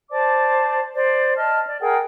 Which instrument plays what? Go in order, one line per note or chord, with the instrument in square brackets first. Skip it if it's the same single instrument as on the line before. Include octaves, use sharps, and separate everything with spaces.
[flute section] C5 D5 A5 D6
C5 D5
D#5 A5 F6
D5
G#4 A#4 F#5 G5